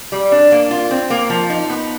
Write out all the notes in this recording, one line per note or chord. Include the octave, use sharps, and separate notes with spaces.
G3
D4
A#3
F4
C4
A#3
F3
D#4
B3